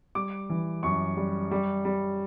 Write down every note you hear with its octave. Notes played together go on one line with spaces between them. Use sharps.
G3 D6
E3
F#2 C#6
G3
G3
G3